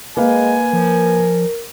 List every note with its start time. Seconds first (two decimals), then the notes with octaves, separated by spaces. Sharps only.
0.17 G#3 A#3 B4 F5 G#5
0.73 F3 A#4